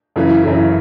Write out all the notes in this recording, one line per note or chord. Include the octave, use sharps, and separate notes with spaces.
F#2 C#3 E3
F#2 C#3 E3